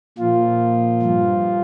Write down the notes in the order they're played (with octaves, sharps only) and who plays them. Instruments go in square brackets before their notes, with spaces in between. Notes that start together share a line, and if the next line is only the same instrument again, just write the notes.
[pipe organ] A#2 F3 F4
G2 F3